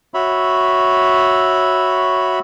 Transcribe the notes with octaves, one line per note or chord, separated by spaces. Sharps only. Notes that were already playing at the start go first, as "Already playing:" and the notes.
F#4 C#5 E5 B5